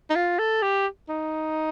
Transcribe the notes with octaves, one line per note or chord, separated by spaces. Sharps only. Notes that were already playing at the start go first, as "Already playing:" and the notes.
D#4
F4
A4
G4
D#4